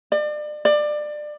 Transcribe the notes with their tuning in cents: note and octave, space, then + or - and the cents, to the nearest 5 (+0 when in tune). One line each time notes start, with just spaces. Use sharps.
D5 +35
D5 +25